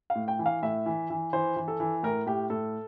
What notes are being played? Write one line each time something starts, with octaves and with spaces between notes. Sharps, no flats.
F5
A2
G5
E3
F5
A2 E5
E3
E3
E3 C5
E3
A4
E3
A2 A#4
A2 G4
A2 A4